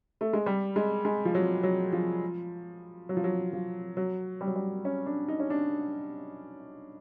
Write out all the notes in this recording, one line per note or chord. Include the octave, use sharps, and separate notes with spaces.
A3
G#3
G3
G#3
G#3
F3
F#3
F#3
F3
F#3
F3
F#3
F3
F#3
G3
F#3
G3
C#4
D4
D#4
C#4
D4